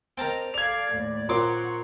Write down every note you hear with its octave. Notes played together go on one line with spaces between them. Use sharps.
C4 A#4 D#5 G5 A5 A#5 F6
A4 D5 F5 G#6 F7
D#2 A2
A#2 C4 A#4 C#5 F#5 C6 D6